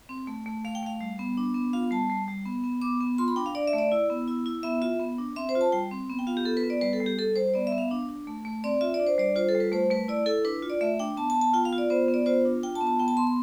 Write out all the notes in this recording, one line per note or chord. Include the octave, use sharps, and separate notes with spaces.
C4
A3
A3
A3 F5
G5
A3 F5
G3
B3
D4
B3
F4 F5
G3 A5
G3
G3
B3
B3
B3 D6
B3
F4 C6
B5
D4 G5
F5
D4 D5
E5
A3
D5
E4
B3
E4
E4
B3 E5
F4 E5
B3
D4
C4 E5
C5
F4
A5
G3 G5
C4
B3
G5
F4 F5
G4
B3 A4
B4
B3
D5
G3 B4
A4
G3
G4
G3 A4
G3 C5
B3 D5
E5
B3
F5
D4
D4
A3
A3
C4 D5
F4 E5
D5
D4
C5
G3 D5
F4 C5
A4
G3
B4
A3 C5
A3 B4
E4 D5
E4 A4
D4 B4
F4
D5
A3 E5
D4 G5
B3 A5
A5
B3
A5
F4 G5
F5
F4
D5
B3 C5
B3
D5
F4 C5
D4
F4 G5
A5
B3
A5
B3 G5
A5
B3 C6
C6